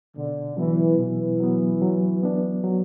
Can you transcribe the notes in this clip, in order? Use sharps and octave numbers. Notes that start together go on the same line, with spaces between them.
B2 D3
E3 F#3 B3
B2 E3
F#3 B3
F#3
B3 D4
F#3